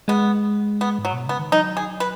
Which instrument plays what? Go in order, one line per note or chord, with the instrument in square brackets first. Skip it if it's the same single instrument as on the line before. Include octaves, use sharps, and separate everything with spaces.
[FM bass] G#3 [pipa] B3
[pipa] B3
[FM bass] G#2
[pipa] F#3
[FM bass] B2
[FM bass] C#3 [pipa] B3
[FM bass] D#3
[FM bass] F#3 [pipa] D#4
[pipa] G#4
B4